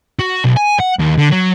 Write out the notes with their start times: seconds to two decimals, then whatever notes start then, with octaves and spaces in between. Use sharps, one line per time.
0.19 F#4
0.45 B1
0.57 G#5
0.80 F#5
1.00 D#2
1.18 D3
1.32 F#3